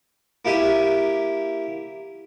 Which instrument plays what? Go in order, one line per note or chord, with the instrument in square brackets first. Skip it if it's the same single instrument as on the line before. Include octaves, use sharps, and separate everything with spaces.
[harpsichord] A#3 E4 G4 E5 G#5